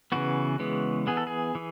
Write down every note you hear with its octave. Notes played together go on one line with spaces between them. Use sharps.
C#3 E3 B3 F#4
C#3 E3 G#3 B3
E3 B3 G#4
A4
G#4
E3